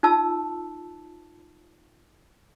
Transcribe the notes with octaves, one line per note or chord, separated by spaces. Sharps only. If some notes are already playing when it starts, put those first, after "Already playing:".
D#4 F4 A5 E6